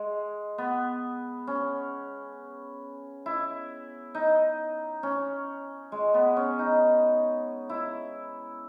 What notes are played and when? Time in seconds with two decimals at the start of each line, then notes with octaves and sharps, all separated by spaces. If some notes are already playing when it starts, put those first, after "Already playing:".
Already playing: G#3
0.58 B3
1.47 C#4
3.26 E4
4.15 D#4
5.03 C#4
5.92 G#3
6.14 B3
6.37 C#4
6.59 D#4
7.69 E4